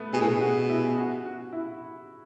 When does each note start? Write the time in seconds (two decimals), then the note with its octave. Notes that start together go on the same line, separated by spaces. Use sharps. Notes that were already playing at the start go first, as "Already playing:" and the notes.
Already playing: A3 B3
0.13 B2 G#4
0.20 A2
0.28 B2
0.33 G#4
0.41 F#4
0.69 E4
0.98 F#4
1.25 F#4
1.52 E4